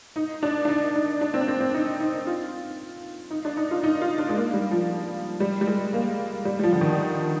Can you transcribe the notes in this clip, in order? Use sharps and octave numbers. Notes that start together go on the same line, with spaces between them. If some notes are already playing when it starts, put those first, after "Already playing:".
D#4
D4
D4
D#4
D#4
D4
C4
D4
C4
C4
D#4
D#4
F4
D#4
D4
D#4
F4
D#4
F4
D4
G#3
A#3
G3
F3
G3
G3
G#3
A#3
G3
G3
F3
D3
D#3